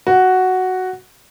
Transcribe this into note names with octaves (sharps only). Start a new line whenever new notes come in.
F#4